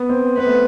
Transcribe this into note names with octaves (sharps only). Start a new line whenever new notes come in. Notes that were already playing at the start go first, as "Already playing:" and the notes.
Already playing: B3
C4
B3 B4
A3